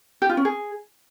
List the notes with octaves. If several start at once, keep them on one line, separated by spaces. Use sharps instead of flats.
G4
F4
C#4
G#4